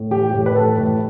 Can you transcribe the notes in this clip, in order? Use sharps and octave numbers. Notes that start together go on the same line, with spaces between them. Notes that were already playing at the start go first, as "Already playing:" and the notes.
Already playing: A2
E3 G4
A2
B4
E3 A4
A2